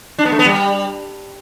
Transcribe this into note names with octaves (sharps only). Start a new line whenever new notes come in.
D4
B3
A3
B3
G3